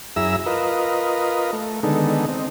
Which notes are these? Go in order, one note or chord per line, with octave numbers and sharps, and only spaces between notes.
F#2 E4 G#4 E5 A#5 E6
F4 A#4 B4 D#5
A3
D3 D#3 G#3 B3 D#4 A4
C4 D#4